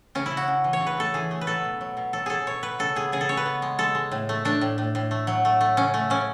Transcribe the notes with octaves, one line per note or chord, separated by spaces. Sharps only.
C#3 C#4
E4
C#3
F#4
C#3
E3
C#5
C#3
B4
A3 A4
E3 G#4
A3
B4
F#3 A4
B2
F#3
B2
F#3 A4
F#3 G#4 A4
B2 C#5
B2 B4
C#3 A4
B3 G#4
C#3 G#4
A4
C#3 C#5
B4
B3
G#3
G#3 A4
G#3
A2
A3
A3 D4
A2
A2
A2
A3
F#3
A3
A3
C#3 C#4
A3
C#3 C#4